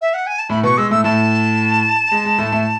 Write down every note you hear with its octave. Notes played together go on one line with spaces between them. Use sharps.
E5
F#5
G#5
A5
A2 A3 B5
B2 B3 C#6
G#3 E6
A2 A3 E6
A2 A3 A5
G#3
G#3
A2 A3
A2 A3